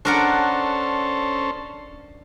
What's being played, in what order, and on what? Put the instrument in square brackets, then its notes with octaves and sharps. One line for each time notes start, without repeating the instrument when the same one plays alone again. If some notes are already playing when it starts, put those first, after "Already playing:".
[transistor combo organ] C#4 A4 C5 [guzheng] D4 A#4 F#5